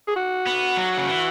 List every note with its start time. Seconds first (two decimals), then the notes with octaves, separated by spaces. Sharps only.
0.08 G#4
0.16 F#4
0.46 B3
0.77 F#3
0.97 C#3
1.08 E3